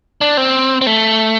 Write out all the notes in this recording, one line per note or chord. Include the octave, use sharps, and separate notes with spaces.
D4
C4
C4
A3